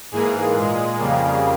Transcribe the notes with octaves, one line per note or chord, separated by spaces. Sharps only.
G#2 E3 A#3 G#4
A#2 G#3
F2 C#3 G3 A#3